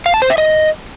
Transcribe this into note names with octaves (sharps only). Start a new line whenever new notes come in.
F5
A5
C5
E5
D#5